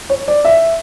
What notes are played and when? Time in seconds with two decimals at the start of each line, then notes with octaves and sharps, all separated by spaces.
0.10 C#5
0.28 D5
0.45 E5